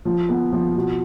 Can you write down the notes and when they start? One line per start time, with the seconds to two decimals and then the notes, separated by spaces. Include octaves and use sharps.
0.05 F3
0.29 B3
0.52 F3
0.75 B2